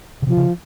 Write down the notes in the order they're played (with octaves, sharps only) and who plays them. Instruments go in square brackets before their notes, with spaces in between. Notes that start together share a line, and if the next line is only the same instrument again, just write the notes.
[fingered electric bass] C#3
[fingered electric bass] C3 [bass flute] F3
[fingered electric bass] C#3